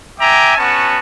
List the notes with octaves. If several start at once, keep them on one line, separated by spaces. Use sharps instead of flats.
E5 G5 G#5 A#5 D6
B3 C#4 F#4 A5